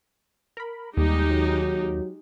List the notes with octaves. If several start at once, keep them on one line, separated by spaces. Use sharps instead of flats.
A#4 B5
D#2 G3 G#3 D#4 G4
F#3